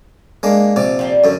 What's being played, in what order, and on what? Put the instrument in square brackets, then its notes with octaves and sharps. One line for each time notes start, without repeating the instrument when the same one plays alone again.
[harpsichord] G#3 A#3 D4
A#1 C3 D5
[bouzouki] F3 G3 A#3
[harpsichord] F#2 D3